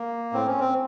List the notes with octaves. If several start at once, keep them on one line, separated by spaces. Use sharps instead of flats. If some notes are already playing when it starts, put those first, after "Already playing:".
Already playing: A#3
A2 C4
C#4
C4